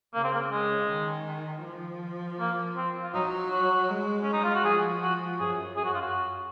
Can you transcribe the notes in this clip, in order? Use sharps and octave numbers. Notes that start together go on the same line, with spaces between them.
C#3 A#3
C4
A#3
G#3
D#3
F3
A#3
C4
F4
F#3 D#4
F#4
G#3
C#4
D#4
F4
F#4
F3 G#4
F#4
F#2 G#4
G#4
F#4
F4
F#4